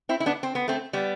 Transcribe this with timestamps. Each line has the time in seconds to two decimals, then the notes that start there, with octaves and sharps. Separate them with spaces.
0.09 C4 E4
0.20 E4
0.26 B3 D4
0.43 C4
0.55 B3
0.68 A3 C4
0.93 G3 B3